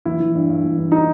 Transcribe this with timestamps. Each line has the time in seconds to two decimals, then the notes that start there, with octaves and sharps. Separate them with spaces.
0.05 E3 E4
0.20 E3
0.35 G2
0.49 G2
0.64 E3
0.78 G2
0.92 D#4